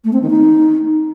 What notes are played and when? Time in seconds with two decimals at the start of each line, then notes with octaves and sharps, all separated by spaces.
0.04 A3
0.12 C4
0.21 D#3
0.30 D#4